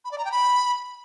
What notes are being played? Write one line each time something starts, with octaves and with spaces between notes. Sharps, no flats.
B5
D5
A#5
G5
B5